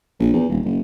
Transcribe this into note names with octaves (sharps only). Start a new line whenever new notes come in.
A#1
E2
D#1
F#1